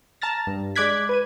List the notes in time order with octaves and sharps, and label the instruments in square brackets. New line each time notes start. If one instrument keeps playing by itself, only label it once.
[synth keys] A5 A#5 F6 A6 A#6
G2
G#3 D5 D6 F#6 G#6 B6
B4 G#6 D#7